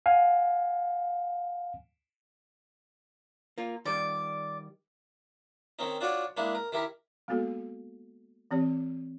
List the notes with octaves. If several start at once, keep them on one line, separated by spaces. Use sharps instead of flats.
F5 F#5 G#5
A#3 F4
D#3 G3 D5
D#3 C4 C#4 D#4
D4 F4 F#4 C#5 D5 F#5
G#3 A#3 D4 E4
A#4
D#3 E4 G4 A#4
G#3 A#3 B3 F#4 A4
E3 C4 G4 C#5